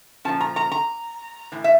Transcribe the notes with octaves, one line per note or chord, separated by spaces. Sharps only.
A#2 F3 C#4 A5
A#5
A#5
A#5
A2 E3
E5